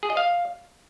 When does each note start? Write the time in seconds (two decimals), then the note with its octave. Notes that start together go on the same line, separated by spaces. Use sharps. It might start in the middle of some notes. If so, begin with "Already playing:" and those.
0.03 G#4
0.10 D#5
0.17 F5